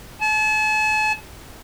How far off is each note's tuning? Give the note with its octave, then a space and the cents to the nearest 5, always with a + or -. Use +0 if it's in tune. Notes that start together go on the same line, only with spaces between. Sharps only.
A5 -40